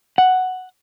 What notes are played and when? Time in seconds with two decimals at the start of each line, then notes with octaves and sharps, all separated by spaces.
0.18 F#5